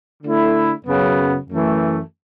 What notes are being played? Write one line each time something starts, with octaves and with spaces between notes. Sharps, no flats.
D3 A3 E4
F#2 C#3 F#3 B3
F#2 E3 A3